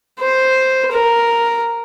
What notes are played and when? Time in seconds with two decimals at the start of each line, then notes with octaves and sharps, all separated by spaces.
0.20 C5
0.92 A#4